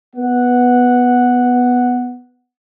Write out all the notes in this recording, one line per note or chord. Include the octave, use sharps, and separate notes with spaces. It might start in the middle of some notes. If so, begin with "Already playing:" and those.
B3 F#5